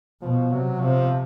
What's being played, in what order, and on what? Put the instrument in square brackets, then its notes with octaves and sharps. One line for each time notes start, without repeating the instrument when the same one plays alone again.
[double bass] B2 [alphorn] F3
[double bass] C3 [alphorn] F#3
[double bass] C3 [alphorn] F3